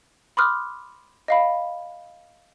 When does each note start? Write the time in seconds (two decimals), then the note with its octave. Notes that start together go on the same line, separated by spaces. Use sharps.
0.37 B5 C6 D6 D#6 F6 F#6
1.28 D#5 F5 B5